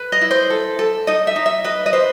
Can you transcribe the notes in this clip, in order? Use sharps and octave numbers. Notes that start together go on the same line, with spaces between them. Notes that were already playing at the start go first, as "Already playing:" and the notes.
Already playing: B4
D#5
E4
C5
A4
A4
D#4 D#5
E5
D#4
E5
B4 D#5
D#5
B4 C5